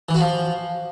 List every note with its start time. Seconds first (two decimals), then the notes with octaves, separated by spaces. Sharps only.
0.09 E3
0.14 F#4
0.20 F3